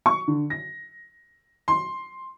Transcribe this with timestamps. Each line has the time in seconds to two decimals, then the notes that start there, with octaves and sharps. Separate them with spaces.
0.06 C#6
0.28 D3
0.50 A#6
1.68 C6